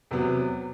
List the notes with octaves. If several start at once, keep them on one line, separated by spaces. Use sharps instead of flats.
E2 C3 F#3 B3